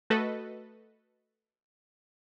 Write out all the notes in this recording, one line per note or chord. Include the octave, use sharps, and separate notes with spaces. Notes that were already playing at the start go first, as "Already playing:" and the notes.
A3 F#4 A4 B4 D#5